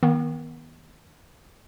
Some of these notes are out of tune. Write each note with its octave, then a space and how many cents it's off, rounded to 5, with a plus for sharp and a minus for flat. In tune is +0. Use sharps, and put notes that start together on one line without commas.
D#3 +20 B3 -30